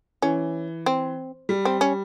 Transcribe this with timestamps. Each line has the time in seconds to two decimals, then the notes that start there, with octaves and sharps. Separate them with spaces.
0.22 E3 C#4
0.86 C4
1.49 G3
1.65 C4
1.81 C#4